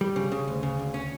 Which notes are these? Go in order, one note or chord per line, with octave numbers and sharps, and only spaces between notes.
G3
C#3
C#3
D2
C#3
D2
C#4